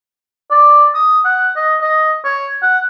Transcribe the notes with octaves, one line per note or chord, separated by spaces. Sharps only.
D5
D#6
F#5
D#5
D#5
C#5
F#5